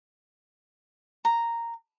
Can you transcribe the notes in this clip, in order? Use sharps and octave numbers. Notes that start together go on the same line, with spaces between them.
A#5